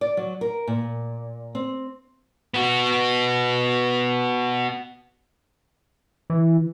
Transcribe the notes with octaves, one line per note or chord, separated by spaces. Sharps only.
D5
F#3
A#4
A#2
C4
B3 F#4
E3